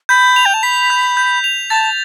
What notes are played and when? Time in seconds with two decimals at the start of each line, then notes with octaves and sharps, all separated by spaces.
0.09 B5 G6
0.36 F7
0.46 G5
0.54 A5
0.63 B5 B6
0.90 G6
1.17 G6
1.44 F7
1.70 A5 A6